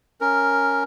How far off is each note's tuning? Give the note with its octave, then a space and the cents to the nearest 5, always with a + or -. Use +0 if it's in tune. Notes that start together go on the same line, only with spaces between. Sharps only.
C#4 +0 A#4 +0